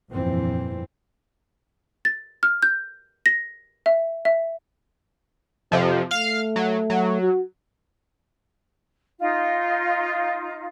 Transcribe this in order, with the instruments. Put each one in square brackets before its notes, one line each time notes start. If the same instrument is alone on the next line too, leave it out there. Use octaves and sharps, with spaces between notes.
[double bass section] G1 F2 A#2 E3 C4
[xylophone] A6
F6
G6
A#6
E5
E5
[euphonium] F2 [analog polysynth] C3 F3
[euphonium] A3 [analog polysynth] F5 F6
[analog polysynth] F#3
F#3
[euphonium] F#4
[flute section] D#4 F4